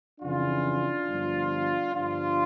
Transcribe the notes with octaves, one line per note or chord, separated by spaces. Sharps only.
F2 C#3 E3 D4 F4
G1 G2 F3
G1 G2 F3 D4 F4